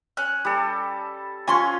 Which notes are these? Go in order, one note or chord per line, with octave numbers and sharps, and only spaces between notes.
C#4 F#6
G3 A4
F3 C#4 F4 G#5 C6 C#6